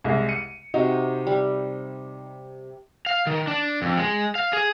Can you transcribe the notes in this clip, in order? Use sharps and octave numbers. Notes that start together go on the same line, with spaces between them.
C2 G#3
C#7 D#7
C3 D#4 F#4 A#5
G3
F5
D#3
D4
F2
G#3
F5
G#4